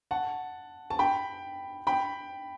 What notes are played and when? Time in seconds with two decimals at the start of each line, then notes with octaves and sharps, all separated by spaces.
0.11 F#5 A5
0.90 A5
0.99 G5 B5
1.87 G5 B5